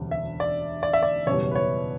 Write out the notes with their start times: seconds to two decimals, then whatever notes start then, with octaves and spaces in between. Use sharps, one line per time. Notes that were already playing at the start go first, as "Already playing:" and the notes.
Already playing: E1 D2 C#3 G3
0.11 E5
0.40 D5
0.83 D5
0.93 E5
1.03 D5
1.27 F#1 E2 B2 G3 C#5
1.51 B4
1.55 C#5